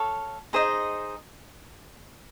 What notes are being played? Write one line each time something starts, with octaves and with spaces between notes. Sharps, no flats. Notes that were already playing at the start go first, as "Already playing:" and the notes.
Already playing: A4 C#5 F5
D#4 G#4 C5 D#5